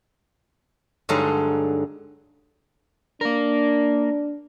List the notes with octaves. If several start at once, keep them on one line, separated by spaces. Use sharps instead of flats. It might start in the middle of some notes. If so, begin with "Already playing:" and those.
G2 D3 F#3 G#3 D#4
A#3 D4 A#4